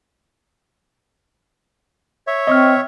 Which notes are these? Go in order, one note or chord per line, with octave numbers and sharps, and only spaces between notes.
C#5 E5
C4 D#5 C#6 F6